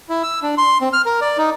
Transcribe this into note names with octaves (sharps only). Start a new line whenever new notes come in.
E4
E6
D4
C6
C4
F6
A#4
D5
D#4